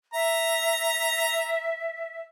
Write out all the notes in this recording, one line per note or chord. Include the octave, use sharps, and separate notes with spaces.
E5 A#5